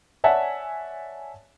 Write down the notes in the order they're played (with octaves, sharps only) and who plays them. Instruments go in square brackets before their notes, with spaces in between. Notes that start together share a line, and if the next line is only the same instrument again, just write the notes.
[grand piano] C#5 D5 E5 F#5 G#5 A5